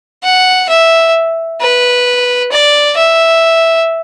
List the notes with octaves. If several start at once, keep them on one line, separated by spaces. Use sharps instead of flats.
F#5
E5
B4
D5
E5